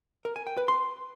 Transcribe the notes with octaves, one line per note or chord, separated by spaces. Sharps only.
A#4
G#5
G5
B4
C6